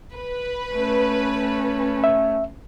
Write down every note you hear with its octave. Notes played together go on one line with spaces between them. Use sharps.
B4
A3 C#4
E5